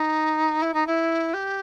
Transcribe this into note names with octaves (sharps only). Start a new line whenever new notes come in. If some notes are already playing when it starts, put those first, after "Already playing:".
Already playing: D#4
E4
D#4
E4
G4